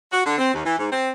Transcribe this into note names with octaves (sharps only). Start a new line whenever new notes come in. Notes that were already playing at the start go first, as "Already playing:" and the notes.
F#4
D3
C4
D#2
E3
G#2
C4